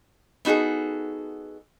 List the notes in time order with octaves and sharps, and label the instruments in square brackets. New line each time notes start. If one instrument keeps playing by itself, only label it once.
[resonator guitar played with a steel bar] B3 D#4 F#4 G#4 A4